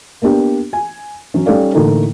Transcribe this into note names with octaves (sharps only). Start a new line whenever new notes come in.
A#3 B3 D4 G4
G#5
F#3 C#4
G3 C#4 D#4 A4 D5 F5
A2 D3 E3 A#3 D#4 A4